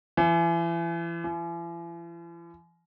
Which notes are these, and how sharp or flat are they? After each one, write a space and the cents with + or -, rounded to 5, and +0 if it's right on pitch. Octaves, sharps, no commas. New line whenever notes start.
E3 +35
E3 +45